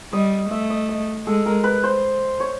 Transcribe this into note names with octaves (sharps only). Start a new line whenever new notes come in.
G3 D#5
A3 E5
D#5
D#5
G#3 A4
A#4
B4
C5
C#5